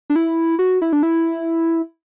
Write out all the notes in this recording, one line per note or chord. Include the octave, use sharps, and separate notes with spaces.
D4
E4
F#4
E4
D4
E4